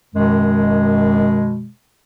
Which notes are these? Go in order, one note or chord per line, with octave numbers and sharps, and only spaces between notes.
F#2 B2 D#3 G#3